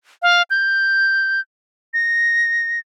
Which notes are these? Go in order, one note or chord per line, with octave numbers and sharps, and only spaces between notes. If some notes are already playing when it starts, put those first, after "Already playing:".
F5
G6
A#6